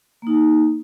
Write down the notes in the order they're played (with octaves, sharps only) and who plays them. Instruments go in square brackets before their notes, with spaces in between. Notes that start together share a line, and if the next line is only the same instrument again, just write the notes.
[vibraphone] A#3 D#4